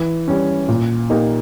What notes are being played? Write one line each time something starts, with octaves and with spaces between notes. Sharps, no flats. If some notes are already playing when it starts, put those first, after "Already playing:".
Already playing: E3
G3 C#4
A#2
A#3 D#4 G4